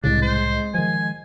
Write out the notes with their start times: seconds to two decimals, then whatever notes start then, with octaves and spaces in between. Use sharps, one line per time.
0.04 C2 A2 C#3 G#3 D4
0.22 C5
0.74 D#3 F3 G#5